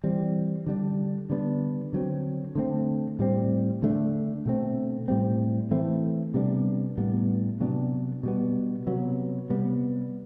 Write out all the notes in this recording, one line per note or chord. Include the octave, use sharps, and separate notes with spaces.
E3 G3 C4
D3 G3 D4
D3 G3 B3 D4
D3 F#3 C4
D3 A3 C4
A2 G3 C4
D3 A3 D4
B2 A3 C4
A2 G3 C4
E3 A3 C4
C3 G3 B3 D4
A2 G3 B3
C3 F#3 B3 D4
B2 G3 B3
C3 F#3 B3
C3 G3 B3